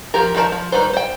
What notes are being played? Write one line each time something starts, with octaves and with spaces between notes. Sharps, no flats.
F3 G4 A#4
D#3 F3 G#3 A#4 A5
F3
D#3 G3 B4 C5
C5 G5